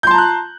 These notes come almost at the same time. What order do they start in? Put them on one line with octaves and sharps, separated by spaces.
G6 C6 A5 A#5 F#6